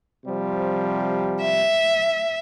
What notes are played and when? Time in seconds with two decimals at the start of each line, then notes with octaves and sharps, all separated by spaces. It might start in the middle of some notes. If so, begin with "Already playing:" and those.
0.24 C3 F3 G3
1.42 E5